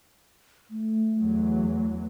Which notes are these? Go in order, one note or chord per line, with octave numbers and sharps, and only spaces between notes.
A3
E2 F#3